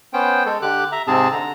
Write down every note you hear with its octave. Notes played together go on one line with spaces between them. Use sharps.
B3 C#4 C5 G5
G#3 A4
D3 G4 D6 F#6
E5 A#5
G#2 C3 C4 G#4 A5
D3 A#5